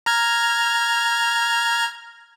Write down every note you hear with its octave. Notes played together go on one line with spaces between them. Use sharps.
A#5 F6 G#6